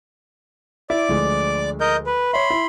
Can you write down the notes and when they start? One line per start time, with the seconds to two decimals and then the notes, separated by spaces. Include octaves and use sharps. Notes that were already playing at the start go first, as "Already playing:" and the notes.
0.90 E4 D5 D6
1.09 D2 F3 G#3
1.81 A#4 D#5 G6
2.07 B4
2.33 C#5 E5 B5 C6
2.50 E4